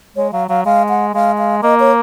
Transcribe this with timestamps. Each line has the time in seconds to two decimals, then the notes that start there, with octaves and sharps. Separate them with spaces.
0.17 G#3 C#5
0.33 F#3 F5
0.49 F#3 F5
0.65 G#3 F5
0.89 F#5
1.14 G#3 F5
1.39 F5
1.63 A#3 D#5
1.80 C#5